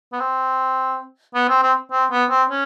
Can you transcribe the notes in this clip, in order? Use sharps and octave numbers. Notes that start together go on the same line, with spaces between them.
B3
C4
B3
C4
C4
C4
B3
C4
C#4